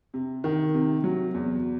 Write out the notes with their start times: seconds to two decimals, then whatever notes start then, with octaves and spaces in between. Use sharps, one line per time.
0.14 C3
0.44 D#3
0.74 C3
1.04 F#3
1.34 E2